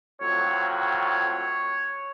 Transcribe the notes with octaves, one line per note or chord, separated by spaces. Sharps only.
F2 A2 F#3 C#5